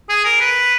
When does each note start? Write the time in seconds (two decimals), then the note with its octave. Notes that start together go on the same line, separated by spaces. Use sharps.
0.09 G#4
0.25 A#4
0.41 B4